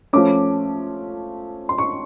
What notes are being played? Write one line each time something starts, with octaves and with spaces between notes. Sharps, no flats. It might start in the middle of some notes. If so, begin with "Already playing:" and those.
F3 A3 C#4 D6
C6
C#6